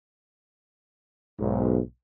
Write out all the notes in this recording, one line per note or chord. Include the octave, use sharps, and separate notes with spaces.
B1 G#2